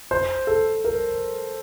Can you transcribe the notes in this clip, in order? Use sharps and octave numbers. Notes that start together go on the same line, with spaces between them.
C5
A4
A#4